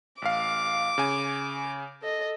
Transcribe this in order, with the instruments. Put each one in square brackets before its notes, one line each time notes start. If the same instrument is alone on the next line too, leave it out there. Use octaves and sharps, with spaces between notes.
[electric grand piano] A1 F5 [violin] D6
[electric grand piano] C#3 G#5
[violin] A4 D#5